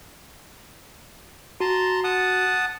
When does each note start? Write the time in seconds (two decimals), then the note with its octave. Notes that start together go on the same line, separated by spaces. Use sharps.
1.60 F#4 A5 A#5 C6
2.04 F#5 A5 D#6